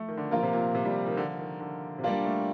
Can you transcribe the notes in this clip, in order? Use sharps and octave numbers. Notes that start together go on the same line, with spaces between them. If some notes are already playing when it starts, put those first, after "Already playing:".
Already playing: F3 A3
D#3
D3
A#2 F3 A#3 F4 A#4
C3
A#2
C3
G3
D#3
D3
D#3
D3
C3
A#2 G3 A#3 D4 F4
A3